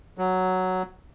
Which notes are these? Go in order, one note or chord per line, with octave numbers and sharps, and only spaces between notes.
F#3